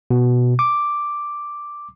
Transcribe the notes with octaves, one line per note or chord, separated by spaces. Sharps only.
B2
D6